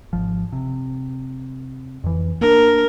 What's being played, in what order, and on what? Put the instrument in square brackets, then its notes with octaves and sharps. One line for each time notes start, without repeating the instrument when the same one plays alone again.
[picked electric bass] G#1 F3
C3
F2 E3
[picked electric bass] A#3 D4 [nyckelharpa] A#4